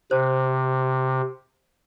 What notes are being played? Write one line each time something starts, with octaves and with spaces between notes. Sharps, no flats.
C3 C5